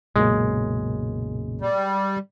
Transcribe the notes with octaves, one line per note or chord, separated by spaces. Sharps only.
B1 F#2 A#2 C#3 G#3 A#3
G3